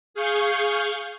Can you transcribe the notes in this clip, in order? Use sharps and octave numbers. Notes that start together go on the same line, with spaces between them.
G#4 F5 C#6 G6